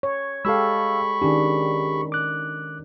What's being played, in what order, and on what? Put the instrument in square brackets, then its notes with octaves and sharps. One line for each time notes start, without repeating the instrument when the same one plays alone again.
[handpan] C#5
[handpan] G#3 G4 A4 [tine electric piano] F5 E6 [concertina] B5 C#6
[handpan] D#3 C#4 D4 [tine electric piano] G4 G#4
[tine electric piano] D6 F#6